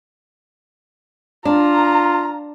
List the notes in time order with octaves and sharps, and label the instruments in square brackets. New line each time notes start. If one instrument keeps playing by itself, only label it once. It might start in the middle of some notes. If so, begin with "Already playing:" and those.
[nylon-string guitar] D4 [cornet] F4 [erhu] A#5